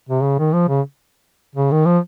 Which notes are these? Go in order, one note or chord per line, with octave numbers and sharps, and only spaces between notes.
C3
C#3
D#3
F3
C#3
C#3
D#3
F3